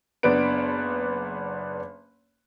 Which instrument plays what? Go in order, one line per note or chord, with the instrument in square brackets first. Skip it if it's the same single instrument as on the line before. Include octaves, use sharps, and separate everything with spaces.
[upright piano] F#1 B3 D4 B4 D7